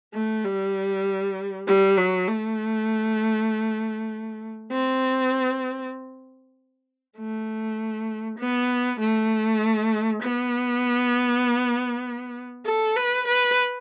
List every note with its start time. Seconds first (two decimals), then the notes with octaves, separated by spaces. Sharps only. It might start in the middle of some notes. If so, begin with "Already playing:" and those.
0.14 A3
0.45 G3
1.67 G3
1.97 F#3
2.27 A3
4.72 C4
7.17 A3
8.39 B3
9.00 A3
10.22 B3
12.66 A4
12.96 B4
13.27 B4